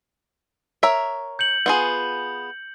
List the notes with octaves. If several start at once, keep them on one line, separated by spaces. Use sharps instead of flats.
A#4 C#5 E5
G6 C#7 F#7
B3 F4 G#4 F#7